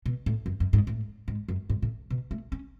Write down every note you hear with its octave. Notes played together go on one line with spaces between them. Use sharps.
B2
A2
F#2
F#2
G#2
A2
G#2
F#2
G#2
A2
B2
A3
C#4